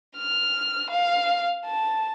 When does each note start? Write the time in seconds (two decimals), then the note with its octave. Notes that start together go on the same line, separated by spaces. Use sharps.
0.17 F6
0.90 F5
1.65 A5